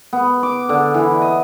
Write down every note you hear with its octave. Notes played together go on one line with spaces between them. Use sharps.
B3
D6
D3
E3
D#5